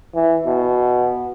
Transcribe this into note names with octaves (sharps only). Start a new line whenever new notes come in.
E3
B2